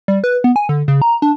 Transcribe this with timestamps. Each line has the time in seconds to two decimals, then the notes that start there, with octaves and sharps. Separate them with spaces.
0.08 G3
0.24 B4
0.44 B3
0.56 G#5
0.69 D3
0.88 C#3
1.02 A#5
1.22 D4